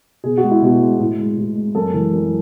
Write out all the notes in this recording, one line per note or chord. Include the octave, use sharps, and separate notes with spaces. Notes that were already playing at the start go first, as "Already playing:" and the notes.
B2 G#4
F#4
G#3
E4
B2 F#4
G#3
A2
G#3
A2
G#3
F#2 A4
E3 G#3
F#2